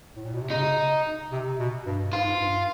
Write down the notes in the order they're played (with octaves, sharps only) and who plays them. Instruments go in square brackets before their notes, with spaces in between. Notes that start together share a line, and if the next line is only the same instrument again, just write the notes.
[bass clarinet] A2
A#2
B2
C3
[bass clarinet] C#3 [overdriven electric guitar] D#4
[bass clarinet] C3
B2
G2
[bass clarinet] G#2 [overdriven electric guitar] F4
[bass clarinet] G2